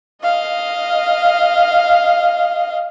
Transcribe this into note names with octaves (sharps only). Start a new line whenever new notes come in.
D#5 F5